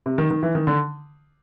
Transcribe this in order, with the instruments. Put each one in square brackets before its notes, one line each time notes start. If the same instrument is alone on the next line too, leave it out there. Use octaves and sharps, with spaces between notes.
[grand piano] C3
D#3
D#3
E3
D#3
D3